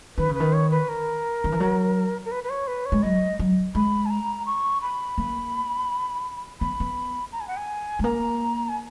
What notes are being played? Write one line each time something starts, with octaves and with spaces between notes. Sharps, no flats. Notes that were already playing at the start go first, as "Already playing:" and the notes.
D#3 B4
C#3
B4
D#3
C#5
B4
A#4
D#3
E3
F#3
A#4
B4
B4
C#5
B4
C#5
G#3
F#3 D#5
F#3
G#3 B5
G#5
A#5
C#6
B5
A#3
B3 B5
B3
A#5
G#5
F#5
G#5
G#3
A#3 A#5
G#5